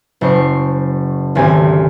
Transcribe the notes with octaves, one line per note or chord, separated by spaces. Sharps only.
F#1 C5 C#6 C7
G#1 D2 C4 G4 G#5 G#6